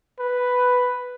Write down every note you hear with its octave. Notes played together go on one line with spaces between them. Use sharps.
B4